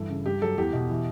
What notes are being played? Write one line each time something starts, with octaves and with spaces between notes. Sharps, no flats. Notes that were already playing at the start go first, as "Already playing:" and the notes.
Already playing: G2 E3 A4
C#3
G2 G4
F#3 A4
E2 G4
B2
E3